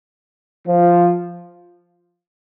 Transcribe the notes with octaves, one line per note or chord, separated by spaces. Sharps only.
F3